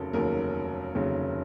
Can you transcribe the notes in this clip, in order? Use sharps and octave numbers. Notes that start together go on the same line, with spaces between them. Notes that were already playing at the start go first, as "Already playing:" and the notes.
Already playing: F1 D#2 C#3 F#3 A4 A#4
F1 D#2 C#3 F#3 A#4
F1 D#2 C#3 F#3